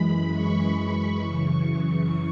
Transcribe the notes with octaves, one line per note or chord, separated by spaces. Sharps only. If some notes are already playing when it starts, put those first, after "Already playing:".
Already playing: F#2 E3 G#3 B5
C#6
F#2 C#3 E3